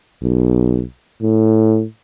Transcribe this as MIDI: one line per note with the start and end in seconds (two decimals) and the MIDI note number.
0.22 0.83 35
1.22 1.85 45